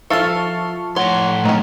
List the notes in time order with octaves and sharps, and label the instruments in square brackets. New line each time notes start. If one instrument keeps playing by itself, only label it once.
[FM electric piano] F3 A5 C#6 [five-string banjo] F4 A4 E5 [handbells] F5 F6
[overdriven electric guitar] A2 C6 [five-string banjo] C#5 [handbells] F#5
[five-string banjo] D#3 C#4 [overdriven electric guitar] F#3 A3